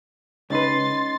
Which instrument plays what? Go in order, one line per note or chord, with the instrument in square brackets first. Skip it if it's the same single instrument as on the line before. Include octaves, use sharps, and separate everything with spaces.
[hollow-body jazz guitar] C#2 B4 [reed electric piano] C#4 D#4 D#5 [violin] C6 A6